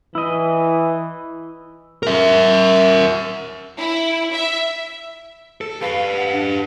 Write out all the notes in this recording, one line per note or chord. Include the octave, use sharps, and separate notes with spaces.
E3 E4 D#5
A#4 E5
E4
E5
A4
G4 B4 F5
F#5
D4